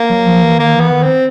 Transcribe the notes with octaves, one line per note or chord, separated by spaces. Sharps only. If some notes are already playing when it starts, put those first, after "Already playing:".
Already playing: A#3
F#3
F3
E3
D#3 A#3
E3
B3
D#3
C4